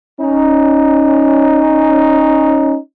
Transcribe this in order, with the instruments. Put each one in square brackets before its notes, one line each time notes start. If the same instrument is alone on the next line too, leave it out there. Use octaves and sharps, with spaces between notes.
[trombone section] C#4 D#4